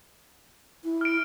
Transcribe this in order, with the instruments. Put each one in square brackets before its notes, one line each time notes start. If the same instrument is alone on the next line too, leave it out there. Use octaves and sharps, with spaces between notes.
[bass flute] E4
[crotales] F6 D7